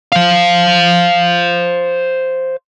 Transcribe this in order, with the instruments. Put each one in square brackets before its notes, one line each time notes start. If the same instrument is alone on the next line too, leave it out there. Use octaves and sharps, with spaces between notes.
[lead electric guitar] C5 F5